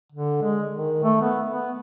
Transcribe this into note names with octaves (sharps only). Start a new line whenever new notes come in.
D3
G#3
D#3
A3
B3
B3